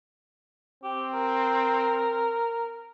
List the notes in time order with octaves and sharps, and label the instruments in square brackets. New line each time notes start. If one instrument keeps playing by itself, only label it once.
[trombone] C4 [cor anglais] G4
[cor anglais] A#4